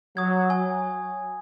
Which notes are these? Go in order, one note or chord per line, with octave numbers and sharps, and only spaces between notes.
F#3 D#6 G#6
G#5